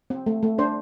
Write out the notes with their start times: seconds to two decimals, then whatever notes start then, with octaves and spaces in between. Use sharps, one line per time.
0.10 C4
0.26 A3
0.43 A3
0.58 D4 C5